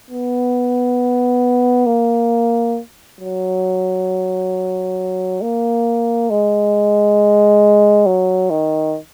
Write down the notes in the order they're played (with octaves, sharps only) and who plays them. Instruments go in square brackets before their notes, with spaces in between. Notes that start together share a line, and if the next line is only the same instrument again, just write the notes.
[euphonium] B3
A#3
F#3
A#3
G#3
F#3
D#3